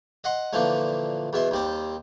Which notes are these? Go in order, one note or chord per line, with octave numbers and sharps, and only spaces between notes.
D#5 F#5 C6
A#2 D3 E3 F3 A3
E2 B2 E5 C6
D#2 G3 C4